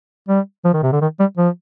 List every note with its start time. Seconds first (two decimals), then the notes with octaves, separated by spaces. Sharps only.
0.29 G3
0.65 F3
0.74 D#3
0.83 C3
0.93 D3
1.02 D#3
1.20 G3
1.38 F3